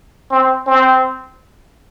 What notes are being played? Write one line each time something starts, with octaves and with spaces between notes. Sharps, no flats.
C4
C4